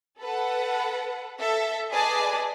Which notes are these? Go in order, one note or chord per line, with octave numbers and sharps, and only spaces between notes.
A4 B4 F#5
A4 E5
G#4 B4 D5 D#5 G#5 A5